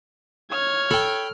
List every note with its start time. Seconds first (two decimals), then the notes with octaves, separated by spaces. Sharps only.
0.52 C#5 F6 G#6
0.91 A4 G5 B5